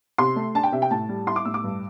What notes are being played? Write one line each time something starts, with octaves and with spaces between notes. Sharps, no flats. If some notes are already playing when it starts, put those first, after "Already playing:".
C3 C6
A3
D4 A5
G5
C3 E5
G5
A2 A5
G3
E4 C6
D6
A2 E6
D6
G2